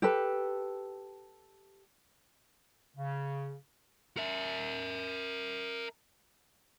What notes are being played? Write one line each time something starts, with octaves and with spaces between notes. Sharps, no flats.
G4 A4 B4
C#3
A#4 E5